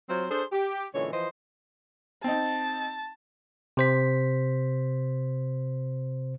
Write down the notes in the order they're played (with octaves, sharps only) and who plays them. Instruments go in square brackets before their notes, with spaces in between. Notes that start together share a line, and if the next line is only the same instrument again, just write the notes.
[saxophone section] F#3 C4 F4 C5
D4 G#4 A4 C5
G4
A#2 D3 E3 G#3 C#4 C#5
E3 F3 C5 D#5
[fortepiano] C4 D#4 [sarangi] A5
[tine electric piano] C3 C5 B6